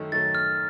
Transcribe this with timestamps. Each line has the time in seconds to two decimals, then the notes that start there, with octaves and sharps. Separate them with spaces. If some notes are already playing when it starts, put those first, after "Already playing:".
Already playing: F#2 D#3 A3
0.12 F#2 D#3 A3 A6
0.35 F6